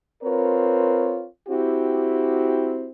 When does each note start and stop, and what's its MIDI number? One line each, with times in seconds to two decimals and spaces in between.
0.24 1.25 60
0.24 1.25 65
0.24 1.25 70
0.24 1.25 71
0.24 1.25 73
1.48 2.91 60
1.48 2.91 64
1.48 2.91 66
1.48 2.91 67